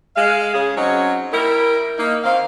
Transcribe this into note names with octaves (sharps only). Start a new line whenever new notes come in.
G#3 F5
C#3 C#4 G#4
F#3 C4 C#4 D#4
G3 E4 A#4
A#3 D#4
D#3 C4 F5